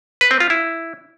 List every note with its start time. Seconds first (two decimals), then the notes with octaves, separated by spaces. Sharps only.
0.21 B4
0.31 C4
0.40 F4
0.50 E4